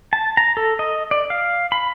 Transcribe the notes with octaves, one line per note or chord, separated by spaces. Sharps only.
A5
A#5
A4
D#5
D5
F5
B5